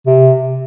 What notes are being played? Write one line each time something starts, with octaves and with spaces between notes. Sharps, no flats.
C3